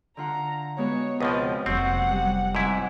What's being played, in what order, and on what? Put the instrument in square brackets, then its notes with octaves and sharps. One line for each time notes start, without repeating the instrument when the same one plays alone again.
[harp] D3 F4 F#5 [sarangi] A#5
[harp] G#3 B3 F#4 [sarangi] C#5
[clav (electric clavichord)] C#2 B2 F3 [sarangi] C4 [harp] D#6
[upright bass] F1 A#3 [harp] F#3 C5 C#6 [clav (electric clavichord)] C4 [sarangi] F#5
[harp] G3
[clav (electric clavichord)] G#2 E4 [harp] C3 F#3